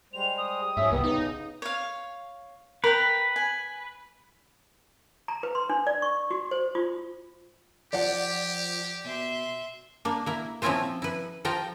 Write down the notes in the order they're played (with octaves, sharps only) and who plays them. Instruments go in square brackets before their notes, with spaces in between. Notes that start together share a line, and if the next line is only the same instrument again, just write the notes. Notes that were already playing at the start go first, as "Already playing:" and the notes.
[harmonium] G3 G#3 C5 [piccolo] F7
[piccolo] D#6
[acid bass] G#2 [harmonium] F#3 C#4 [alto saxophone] E5
[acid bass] C2 [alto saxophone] B3 [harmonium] G4
[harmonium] C#3 [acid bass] D#4
[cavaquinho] C#5 F5
[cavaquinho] A#4 G5 [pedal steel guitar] B4
[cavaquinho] G#5
[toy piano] A#5
B4
C6
D4
D5
C#6
F#4
C5
F4
[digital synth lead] F3 [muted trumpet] G4 [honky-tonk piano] D5 F#5
[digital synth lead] B2 [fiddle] E5 C6
[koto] A#3 D4
A#3 E4
F3 C4 C#4 E4 F4 C5
E4 B4
F3 F4 G5 A#5